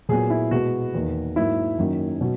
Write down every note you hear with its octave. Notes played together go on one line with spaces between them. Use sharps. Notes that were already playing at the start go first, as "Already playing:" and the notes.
A#2 F#3 B3 G#4
E4
B2 G#3 B3 F#4
E2 D#3 A#3
G#2 F#3 A#3 E4
F#2 D#3 F#3 A#3
B2 F#3